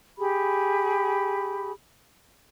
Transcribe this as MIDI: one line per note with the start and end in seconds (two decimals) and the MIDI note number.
0.18 1.72 67
0.18 1.72 68
0.18 1.72 83